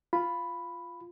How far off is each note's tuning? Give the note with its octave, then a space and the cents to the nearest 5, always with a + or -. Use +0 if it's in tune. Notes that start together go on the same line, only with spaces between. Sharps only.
F4 +0 B5 +0